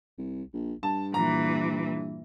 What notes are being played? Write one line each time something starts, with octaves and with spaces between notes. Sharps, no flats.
C2
A#1
G2 A5
A#2 E3 A#5